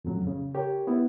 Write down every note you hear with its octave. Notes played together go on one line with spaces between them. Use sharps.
F2 A2 C#3 F#3
C#3
G4 A#4 C#5
B3 E4